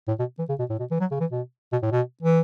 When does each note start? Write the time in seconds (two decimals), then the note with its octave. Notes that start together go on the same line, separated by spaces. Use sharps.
0.08 A2
0.19 B2
0.39 E3
0.49 C#3
0.59 B2
0.70 A2
0.80 B2
0.91 E3
1.00 F#3
1.11 C#3
1.20 E3
1.32 B2
1.73 B2
1.83 A2
1.92 B2
2.23 E3